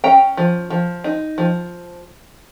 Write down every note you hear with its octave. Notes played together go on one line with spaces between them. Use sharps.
C#4 G5 A#5
F3
F3
D#4
F3